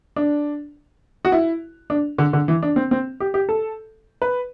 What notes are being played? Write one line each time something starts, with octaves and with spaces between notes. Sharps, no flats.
D4
F#4
E4
D4
D3
D3
E3
D4
C4
C4
G4
G4
A4
B4